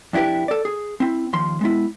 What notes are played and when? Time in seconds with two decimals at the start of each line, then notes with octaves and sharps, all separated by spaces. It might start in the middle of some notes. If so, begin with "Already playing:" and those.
0.13 F2 D4 E4 G4 B4
0.48 A4 D5
0.65 G#4
1.00 C4 E4
1.33 D#2 F3 C6
1.61 G#3 B3 E4